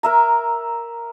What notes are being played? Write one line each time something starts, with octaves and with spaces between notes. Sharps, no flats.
A#4 E5 A#5